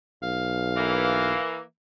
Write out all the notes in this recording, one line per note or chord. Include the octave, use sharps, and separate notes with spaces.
B1 F5
E3 A#3